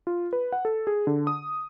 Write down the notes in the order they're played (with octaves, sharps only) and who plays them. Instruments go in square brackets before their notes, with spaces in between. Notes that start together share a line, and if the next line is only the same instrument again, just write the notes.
[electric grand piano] F4
B4
F#5
A4
G#4
D3
D#6